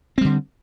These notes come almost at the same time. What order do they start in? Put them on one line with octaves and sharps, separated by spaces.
C4 G3 D3